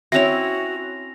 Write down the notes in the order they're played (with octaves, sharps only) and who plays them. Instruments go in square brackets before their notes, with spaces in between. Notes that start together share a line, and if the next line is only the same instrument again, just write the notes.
[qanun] C4 C#4 E4 [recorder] F#4 [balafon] C#5 E5 [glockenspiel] A#6 F7